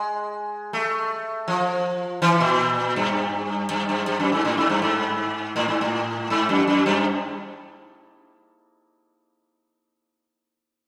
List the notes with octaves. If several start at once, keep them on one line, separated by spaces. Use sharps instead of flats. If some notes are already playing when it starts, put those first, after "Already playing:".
Already playing: G#3
A3
F3
E3
A#2
G2
G2
G2
G2
F#2
G#2
A2
G#2
G2
G#2
A2
G#2
A2
G#2
F#2
F#2
G2